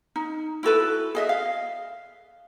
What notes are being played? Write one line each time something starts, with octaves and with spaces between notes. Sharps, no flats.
D#4
E4 F#4 A4 B4
G#4 D#5 E5
F5